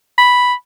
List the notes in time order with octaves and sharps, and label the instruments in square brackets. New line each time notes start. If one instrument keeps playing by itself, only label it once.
[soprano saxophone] B5